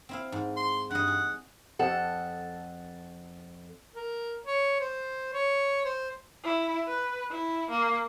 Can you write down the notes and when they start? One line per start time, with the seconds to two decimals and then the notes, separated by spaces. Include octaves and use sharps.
0.09 C4 E4 F5
0.32 G#2
0.57 C6
0.91 G2 D#5 F#5
1.07 G#4
1.79 F2 A4 F#5
3.96 A#4
4.46 C#5
4.81 C5
5.34 C#5
5.85 C5
6.44 E4
6.87 B4
7.30 E4
7.70 A#3